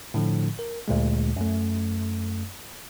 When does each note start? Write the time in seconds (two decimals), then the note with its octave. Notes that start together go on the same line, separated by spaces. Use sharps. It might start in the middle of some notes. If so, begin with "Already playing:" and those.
0.14 A2 D3 F3
0.59 A#4
0.88 D2 A#2 G#3
1.36 F#2 A3